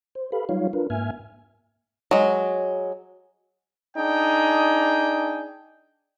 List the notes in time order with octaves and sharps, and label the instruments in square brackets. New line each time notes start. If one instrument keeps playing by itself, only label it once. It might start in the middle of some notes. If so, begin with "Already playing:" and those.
[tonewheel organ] C5
G4 A4 B4 F5 B5
F#3 G3 D#4 F4 C#5 F5
D4 F4 A#4 B4
G#2 A#3 E5 G#5 F6 G#6
[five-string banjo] F#3 G#3
[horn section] D4 D#4 G#4 G5